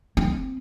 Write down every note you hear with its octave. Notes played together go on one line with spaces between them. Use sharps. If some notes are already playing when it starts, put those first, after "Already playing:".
C4